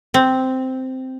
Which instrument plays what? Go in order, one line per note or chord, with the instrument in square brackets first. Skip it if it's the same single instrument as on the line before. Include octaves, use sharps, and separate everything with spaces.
[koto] C4